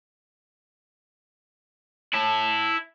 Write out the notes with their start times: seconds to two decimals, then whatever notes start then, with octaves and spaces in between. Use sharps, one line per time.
2.13 E4 A5